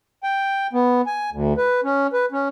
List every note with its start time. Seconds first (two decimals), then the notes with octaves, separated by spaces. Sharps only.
0.24 G5
0.73 B3
1.07 G#5
1.32 D2
1.58 B4
1.84 C#4
2.13 B4
2.32 C#4